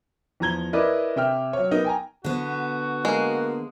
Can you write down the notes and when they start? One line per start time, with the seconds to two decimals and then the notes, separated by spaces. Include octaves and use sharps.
0.40 E2 F3 A#5 G#6 G7
0.73 E4 A#4 B4 D5 D#5 D6
1.16 C3 E5 G5 F6
1.53 F#3 C#5
1.71 B3 D#4 A#4
1.84 G5 G#5 A#5
2.24 D3 B3 F#4
3.05 G#3 A#3